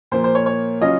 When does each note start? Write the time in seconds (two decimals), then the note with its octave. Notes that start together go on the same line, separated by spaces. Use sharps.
0.12 A#2 F3 A#3 C5
0.24 C5
0.35 C#5
0.46 C#5
0.81 C#3 F#3 C#4 F4 D#5